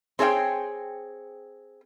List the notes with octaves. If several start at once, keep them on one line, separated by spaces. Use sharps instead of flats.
C4 G#4 C#5 E5 G5